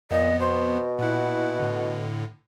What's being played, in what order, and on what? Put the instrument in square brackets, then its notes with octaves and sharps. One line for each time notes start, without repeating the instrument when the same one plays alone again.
[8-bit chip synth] F2 B3 [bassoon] A#2 [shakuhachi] D#5
[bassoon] B2 [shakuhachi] C5
[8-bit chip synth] A#2 E4 [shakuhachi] F#5
[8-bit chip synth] A2 D3